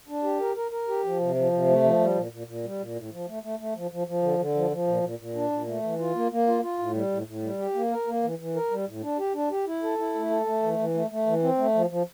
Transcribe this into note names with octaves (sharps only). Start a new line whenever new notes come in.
D4
G4
A#4
A#4
A#4
G4
F3
C3
F3
C3
A3
F3
G3
A#2
A#2
A#2
G3
A#2
A2
F3
A3
A3
A3
F3
F3
F3
D3
D3
F3
F3
A#2
A#2
A#2
D4
A#2
A3
E3
F4
A#3
A#3
F4
F4
A2
G3
A2
A2
G3
G4
A#3
A#4
A#3
E3
E3
A#4
G3
A2
D4
G4
D4
G4
E4
A4
E4
A3
A4
A3
E3
E3
A3
A3
E3
C4
A3
F3
F3